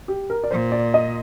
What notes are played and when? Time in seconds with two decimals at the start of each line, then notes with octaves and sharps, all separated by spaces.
0.08 G4
0.30 A#4
0.44 D5
0.51 A#2 C5
0.72 D5
0.94 D#5